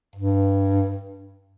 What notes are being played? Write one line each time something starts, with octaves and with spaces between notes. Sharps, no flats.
G2